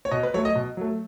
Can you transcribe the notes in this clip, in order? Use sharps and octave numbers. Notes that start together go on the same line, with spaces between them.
C#5
B2 D#5
B4
F#3 A3 C#5
D#5
B2
F#3 A3